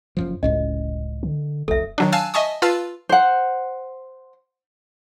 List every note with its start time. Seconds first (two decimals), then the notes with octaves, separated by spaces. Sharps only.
0.17 F#1 F#2 F3
0.43 F1 C#2 A2 C#4 D#5
1.23 D3
1.68 F1 B1 A4 E5
1.98 D#3 F#3 D4
2.12 F5 G#5 A5 E6 F#6
2.34 D#5 E5 G#5 A5 C#6 D#6
2.62 F4 B4 F5 A5 E6 A6
3.09 C5 F#5